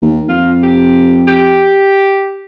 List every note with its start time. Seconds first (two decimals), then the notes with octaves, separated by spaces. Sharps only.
0.02 D#2
0.29 F2 F4
0.63 G4
1.27 G4